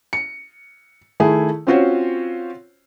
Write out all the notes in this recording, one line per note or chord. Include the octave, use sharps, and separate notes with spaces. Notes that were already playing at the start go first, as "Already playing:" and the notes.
C#7
D#3 A3 E4 G#4
C4 C#4 F4 F#4 C5 C#5